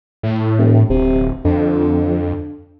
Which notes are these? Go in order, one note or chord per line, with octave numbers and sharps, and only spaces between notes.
A2
E1
D1 C3
F2 D3